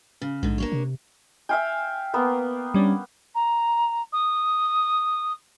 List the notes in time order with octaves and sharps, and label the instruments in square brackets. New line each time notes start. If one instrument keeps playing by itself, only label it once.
[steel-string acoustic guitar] C#3
[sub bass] A#1 [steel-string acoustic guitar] G#2 D3
[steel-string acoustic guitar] A#3 D4 C#5
[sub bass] C3
[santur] E5 F5 G5 [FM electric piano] G#5
[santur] A#3 B3
[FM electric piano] G3 C#4 D4
[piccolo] A#5
D#6